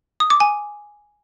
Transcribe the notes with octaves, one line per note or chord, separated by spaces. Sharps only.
D#6
D6
G#5